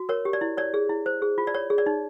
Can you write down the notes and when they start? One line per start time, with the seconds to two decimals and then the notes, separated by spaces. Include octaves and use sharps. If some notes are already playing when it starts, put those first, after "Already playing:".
Already playing: F#4
0.09 A#4 C#5
0.25 G4
0.33 D5
0.41 E4
0.57 C#5 D5
0.74 G#4
0.89 E4
1.06 C5
1.22 G#4
1.38 F4
1.47 D5
1.55 C#5
1.70 G#4
1.78 D5
1.86 D#4